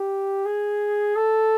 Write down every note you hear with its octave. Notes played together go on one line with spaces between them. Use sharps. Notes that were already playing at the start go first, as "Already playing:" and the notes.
Already playing: G4
G#4
A4